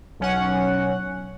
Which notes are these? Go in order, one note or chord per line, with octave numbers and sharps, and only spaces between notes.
B1 C#4 F#5